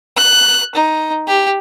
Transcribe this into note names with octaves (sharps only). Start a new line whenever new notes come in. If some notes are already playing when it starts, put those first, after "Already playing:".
F#6
D#4
G4